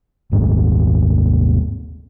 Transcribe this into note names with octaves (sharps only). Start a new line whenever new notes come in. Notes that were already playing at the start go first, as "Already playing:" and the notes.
D#1 G#1 G#2